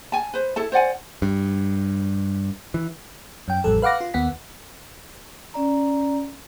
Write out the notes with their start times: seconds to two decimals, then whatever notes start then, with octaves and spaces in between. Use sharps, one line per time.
0.12 G#5 A5
0.34 B4 C5
0.56 E4 A4 A5
0.72 C5 D5 F#5 G#5
1.22 G2
2.74 E3
3.48 F#2 G5
3.64 A1 F2 G3 A4
3.82 B4 F5 F#5 D6 A#6
4.01 F4
4.14 D#2 B3 F#5 B6
5.54 C#4 D5 A#5